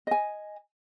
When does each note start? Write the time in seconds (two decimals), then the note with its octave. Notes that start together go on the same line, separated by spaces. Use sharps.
0.07 D#5 G#5